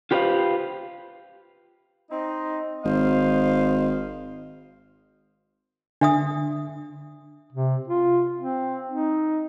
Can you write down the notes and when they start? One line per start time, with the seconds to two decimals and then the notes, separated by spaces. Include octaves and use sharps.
0.11 F4 G4 B4 C5 D5 F5
2.11 C4 D#4
2.84 G#1 C5 D#5 F5
6.01 D3 D4 E5 D#6
7.53 C3
7.88 F4
8.37 C4
8.89 D#4